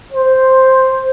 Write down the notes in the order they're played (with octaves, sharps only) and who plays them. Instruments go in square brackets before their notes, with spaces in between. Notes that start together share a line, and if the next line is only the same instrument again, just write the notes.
[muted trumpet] C5